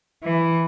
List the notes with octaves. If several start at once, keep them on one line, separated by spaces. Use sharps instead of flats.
E3